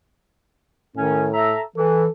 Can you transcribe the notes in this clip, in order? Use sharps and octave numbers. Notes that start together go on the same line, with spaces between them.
A2 D#3 C#4
A4 E5 A#5
E3 A4